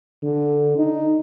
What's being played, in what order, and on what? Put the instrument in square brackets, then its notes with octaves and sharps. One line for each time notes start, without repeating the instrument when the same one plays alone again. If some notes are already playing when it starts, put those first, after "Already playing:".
[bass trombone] D3
D#4